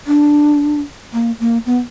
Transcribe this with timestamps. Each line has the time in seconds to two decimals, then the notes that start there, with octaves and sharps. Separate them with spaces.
0.07 D4
1.13 A#3
1.40 A#3
1.66 B3